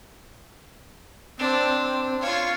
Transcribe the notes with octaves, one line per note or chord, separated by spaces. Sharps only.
C4 D4
F4 C#5 F5